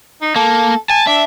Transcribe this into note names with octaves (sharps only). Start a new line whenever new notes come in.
D#4
A#3 A4
G#5 A5
D4 E5